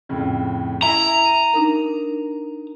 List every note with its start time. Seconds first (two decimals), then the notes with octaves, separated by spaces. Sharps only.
0.09 F2 A2 C#3
0.82 E4 E5 G#5 A#5
1.25 D#7
1.54 D4 D#4 A#4